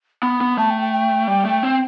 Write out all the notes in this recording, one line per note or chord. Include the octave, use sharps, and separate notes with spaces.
B3 B5
B3
A3 A5
G5
G5
G5
G3
A3
C4